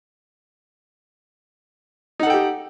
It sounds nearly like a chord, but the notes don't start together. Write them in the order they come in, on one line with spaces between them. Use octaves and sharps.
D#4 F#5 A4 G5 G4